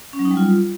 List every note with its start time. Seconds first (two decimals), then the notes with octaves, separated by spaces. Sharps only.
0.13 C#4
0.19 F#3
0.25 D#4
0.31 G3
0.37 F4